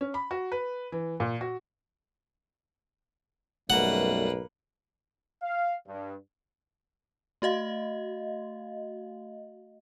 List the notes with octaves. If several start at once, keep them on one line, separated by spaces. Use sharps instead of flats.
C#4
B5
F#4
B4
E3
A#2
F#4
B1 F#2 G3 A3 A#3 B4 F#5
F5
G2
A3 F#4 D#5 F5